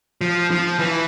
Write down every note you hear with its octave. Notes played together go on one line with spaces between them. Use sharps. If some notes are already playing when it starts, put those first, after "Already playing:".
F3
F3
E3